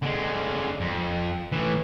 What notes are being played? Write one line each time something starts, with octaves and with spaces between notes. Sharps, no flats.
D3 G#3
F2
A2 E3